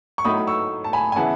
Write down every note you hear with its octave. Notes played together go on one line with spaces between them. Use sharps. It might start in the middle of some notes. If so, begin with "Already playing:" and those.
C#6
A2 F#3 A3 D#4 B5 D#6
C#6 E6
A5
G#5 B5
G#5
C#3 E3 B3 E4 F#5 A5